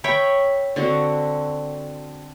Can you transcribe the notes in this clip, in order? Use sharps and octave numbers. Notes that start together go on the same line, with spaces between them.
C#5 E5 G5 B5
D3 C4 F#4